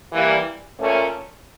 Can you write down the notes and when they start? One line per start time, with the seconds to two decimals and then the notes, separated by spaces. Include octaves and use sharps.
0.12 E3 G3 A#3
0.79 A#2 A3 C#4